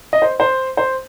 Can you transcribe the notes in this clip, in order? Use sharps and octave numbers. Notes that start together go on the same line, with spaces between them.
D#5
C5
C5
C5